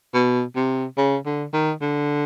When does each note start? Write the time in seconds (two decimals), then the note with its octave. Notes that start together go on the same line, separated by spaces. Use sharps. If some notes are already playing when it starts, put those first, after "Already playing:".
0.14 B2
0.56 C3
0.98 C#3
1.26 D3
1.53 D#3
1.81 D3